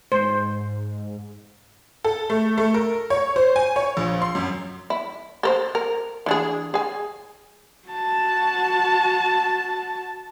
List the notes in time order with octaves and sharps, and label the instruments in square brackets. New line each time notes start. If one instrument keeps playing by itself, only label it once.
[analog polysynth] G#2 [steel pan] C5
[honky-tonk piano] A4
A3
A3
A#4
C#5
C5
G#5
C#5
A#1
C6
F#2
[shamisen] E4
A4 A#4 C5
A#4
E3 D4 G#4
G#4 G#5
[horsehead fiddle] F#4 A5